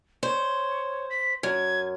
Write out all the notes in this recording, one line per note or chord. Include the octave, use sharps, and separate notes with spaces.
C5 C#5
B6
F#2 G#6